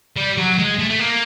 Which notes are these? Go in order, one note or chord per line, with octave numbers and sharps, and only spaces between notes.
G3
F#3
G#3
A3
A3
A#3